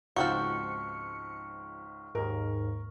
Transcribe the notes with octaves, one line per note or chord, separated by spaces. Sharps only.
C#2 G#2 F3 C4 F#4 C#6 F6 C#7
D#2 G#2 A#4